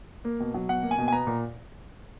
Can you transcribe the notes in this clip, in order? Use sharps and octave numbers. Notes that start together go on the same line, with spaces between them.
A#3
B2
F#3
B2 F#5
A#3
G#5
B2
G#5
B3 A#5
A#2